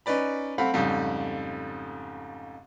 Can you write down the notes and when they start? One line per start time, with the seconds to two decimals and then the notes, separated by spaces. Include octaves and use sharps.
0.06 C#4 D#4 B4 D5 B5
0.58 A3 C4 F5 F#5 B5
0.74 F2 G#2 C#3 G3 A3